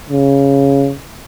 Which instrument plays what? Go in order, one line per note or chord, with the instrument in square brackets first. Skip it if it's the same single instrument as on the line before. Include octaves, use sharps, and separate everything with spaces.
[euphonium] C#3